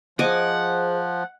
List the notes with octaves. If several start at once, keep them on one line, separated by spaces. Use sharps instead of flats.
F3 G#4 C5 D#5 F#5 G#5 D6